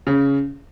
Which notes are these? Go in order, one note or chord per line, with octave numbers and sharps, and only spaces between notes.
C#3